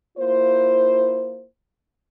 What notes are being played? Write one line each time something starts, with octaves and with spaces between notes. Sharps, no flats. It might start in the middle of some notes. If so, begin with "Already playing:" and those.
A#3 E4 F4 C5